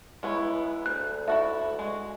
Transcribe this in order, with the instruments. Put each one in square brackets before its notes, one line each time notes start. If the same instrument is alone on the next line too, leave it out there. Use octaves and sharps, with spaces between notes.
[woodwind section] C#2 D#4 E4 [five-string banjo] G#3 B3 C#5
[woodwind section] D2 [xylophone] F#6
[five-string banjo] E4 F#4 A4 [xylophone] E5
[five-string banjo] G#3 F#4